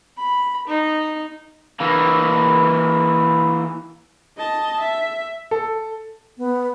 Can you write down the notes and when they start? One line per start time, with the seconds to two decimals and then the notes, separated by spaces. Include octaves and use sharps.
0.17 B5
0.67 D#4
1.81 E3 A#3
4.38 D#5 A5
4.80 E5
5.51 A4
6.38 B3